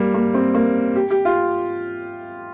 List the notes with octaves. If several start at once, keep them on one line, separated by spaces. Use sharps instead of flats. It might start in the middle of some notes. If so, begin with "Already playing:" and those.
Already playing: G3 A#3
A#3
C4
A#3
G4
G4
F4